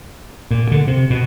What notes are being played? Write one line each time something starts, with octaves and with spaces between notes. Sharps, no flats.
A#2
D3
C3
B2